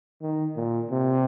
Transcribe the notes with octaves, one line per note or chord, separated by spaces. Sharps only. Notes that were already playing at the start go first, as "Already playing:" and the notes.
D#3
A#2
C3